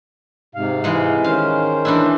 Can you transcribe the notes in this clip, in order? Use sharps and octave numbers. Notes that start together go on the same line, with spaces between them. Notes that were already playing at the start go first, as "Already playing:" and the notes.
G#2 C3 F5
E3 G#3
D#3 C#4 C5 F5
E3 D4 E4